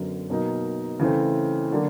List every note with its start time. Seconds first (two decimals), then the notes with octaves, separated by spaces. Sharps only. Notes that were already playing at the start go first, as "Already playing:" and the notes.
Already playing: F#2 D3 F#3 B3
0.30 B2 F#3 A#3 D#4
0.99 C#3 E3 A3 C4
1.71 D3 F#3 A#3 D4 F#4